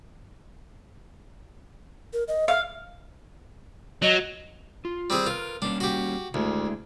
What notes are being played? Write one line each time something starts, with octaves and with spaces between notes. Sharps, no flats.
A#4
D#5
E5 F5
F#3 D#5
F4
G3 C4 G#4
F4 A#4 B4
G3 A#3 C#4 D4
F#4 G4
D2 G#3 D4 E4